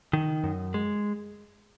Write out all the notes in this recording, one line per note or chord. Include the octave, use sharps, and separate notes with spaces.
D#3
F#2
G#3